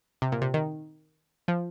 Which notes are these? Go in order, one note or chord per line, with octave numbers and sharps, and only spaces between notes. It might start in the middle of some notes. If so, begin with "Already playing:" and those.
C3
A#2
C3
D#3
F3